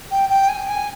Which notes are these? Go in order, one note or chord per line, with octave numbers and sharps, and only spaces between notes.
G5
G5
G#5
G#5